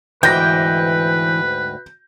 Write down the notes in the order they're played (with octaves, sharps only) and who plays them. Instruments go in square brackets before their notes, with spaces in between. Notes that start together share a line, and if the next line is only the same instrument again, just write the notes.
[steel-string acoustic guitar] D2 G#2 G5 [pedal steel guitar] E3 D6 [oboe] B4 [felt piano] G6 A#6